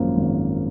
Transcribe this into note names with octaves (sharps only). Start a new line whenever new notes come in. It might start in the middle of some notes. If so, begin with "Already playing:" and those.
Already playing: G#1 F#2 F3 A#3
G#1